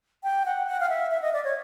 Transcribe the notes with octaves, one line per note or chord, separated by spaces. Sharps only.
G5
F#5
F#5
F5
E5
E5
D#5
D5
C#5